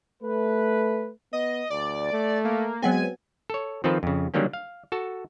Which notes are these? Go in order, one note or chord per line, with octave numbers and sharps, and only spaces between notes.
A3 B4
B3 D#5
D2 D5
A3
A#3
F#3 G#3 B3 C4 G#5
A4 C#5
D#3 F3 C4 F4 A4 B4
F2 C#3
D3 D#3 F#3 G3 A#3 C#4
F5
F#4 A4 A5